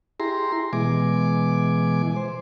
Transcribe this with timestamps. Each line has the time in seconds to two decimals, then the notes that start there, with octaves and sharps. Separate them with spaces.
0.20 E4 G4 G#4 A#5 C6
0.73 B2 E3 G#3 G#5 D6
2.16 C5